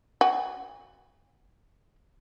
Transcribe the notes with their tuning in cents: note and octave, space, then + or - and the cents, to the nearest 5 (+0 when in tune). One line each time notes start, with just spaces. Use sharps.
F#4 +15 G#5 -40